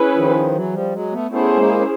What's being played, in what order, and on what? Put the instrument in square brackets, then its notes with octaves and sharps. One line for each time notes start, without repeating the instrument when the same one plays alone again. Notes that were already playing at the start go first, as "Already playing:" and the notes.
Already playing: [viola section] C#4 E4 G#4 B4
[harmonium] D#3 F3
E3 F#3
F3 G3
F#3 G#3
A3 B3
[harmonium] A3 B3 [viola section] C#4 E4 G#4 C5
[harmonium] G#3 A#3